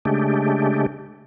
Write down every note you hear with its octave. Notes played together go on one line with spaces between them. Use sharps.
C#3 G#3 A3 D4 G4